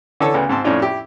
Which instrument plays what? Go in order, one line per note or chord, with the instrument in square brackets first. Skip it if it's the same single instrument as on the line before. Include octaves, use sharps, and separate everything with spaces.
[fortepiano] D3 E3 A4 C#5
D2 C#3 B3
G#2 C4 A5
F2 A2 F3 C#4 D4 F4
E4 G4